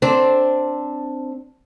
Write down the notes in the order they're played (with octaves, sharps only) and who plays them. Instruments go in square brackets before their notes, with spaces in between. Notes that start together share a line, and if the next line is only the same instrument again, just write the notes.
[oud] C4 D4